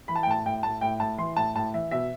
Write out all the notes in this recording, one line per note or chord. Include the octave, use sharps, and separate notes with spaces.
E3 B5
A5
G5
A2 A5
A2 G5
A2 A5
A2 G5
A2 A5
E3 C6
A2 A5
A2 A5
E3 E5
B2 E5